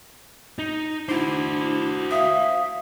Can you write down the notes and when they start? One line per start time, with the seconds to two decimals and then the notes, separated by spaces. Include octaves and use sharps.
0.59 D#4
1.09 D4 E4 F#4 C5
2.11 E5 F5 D#6